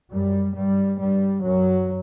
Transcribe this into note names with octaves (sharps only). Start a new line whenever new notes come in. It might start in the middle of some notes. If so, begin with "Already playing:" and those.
F#2 G3
G2 G3
G2 G3
F#2 F#3